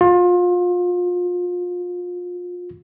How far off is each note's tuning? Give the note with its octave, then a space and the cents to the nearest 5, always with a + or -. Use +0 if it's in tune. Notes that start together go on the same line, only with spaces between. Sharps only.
F4 +30